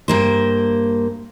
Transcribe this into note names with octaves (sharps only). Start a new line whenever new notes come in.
G2 A#3 C5